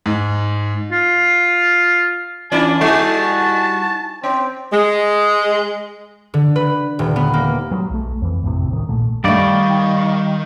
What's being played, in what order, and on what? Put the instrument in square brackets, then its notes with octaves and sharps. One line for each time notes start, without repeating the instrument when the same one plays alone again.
[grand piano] G#2
[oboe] F4
[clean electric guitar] E3 C#4 E4 [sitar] D4 F4 D5 [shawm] A5
[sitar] G3 [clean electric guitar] D#4 E4 G#4 [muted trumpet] F#4
[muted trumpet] C4 [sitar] C#4
[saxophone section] G#3
[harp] D3
B4
D#1
B3
A#3
[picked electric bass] F#3 G#3
B1 A3
F2 E3
A1 F2 A2 C3
D#1 C#2 A2 D#3
A#1 A#2 A3
[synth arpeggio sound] G2 A3 [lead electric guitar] D#3 [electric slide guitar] G3 D5 [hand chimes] F5 C#6